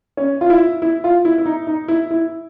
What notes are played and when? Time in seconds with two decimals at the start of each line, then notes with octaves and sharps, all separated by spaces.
0.17 C#4
0.41 F4
0.50 E4
0.82 E4
1.04 F4
1.25 E4
1.38 E4
1.46 D#4
1.67 D#4
1.88 E4
2.11 E4